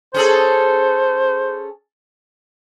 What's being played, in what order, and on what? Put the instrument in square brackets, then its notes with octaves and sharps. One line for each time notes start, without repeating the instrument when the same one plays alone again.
[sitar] C#4 G#4 A4 [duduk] C5